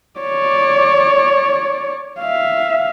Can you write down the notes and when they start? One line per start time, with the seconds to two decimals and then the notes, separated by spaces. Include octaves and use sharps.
0.20 C#5 D5
2.20 E5 F5